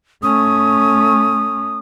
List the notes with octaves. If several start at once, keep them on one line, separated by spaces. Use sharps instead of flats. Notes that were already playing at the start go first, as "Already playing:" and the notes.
A3 C#4 D#6